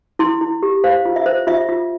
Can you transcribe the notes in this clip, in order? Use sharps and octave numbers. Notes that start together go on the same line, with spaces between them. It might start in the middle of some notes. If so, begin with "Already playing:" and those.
E4 C6
E4
G4
C5 F5
F4
E5
C5
F4 E5
F4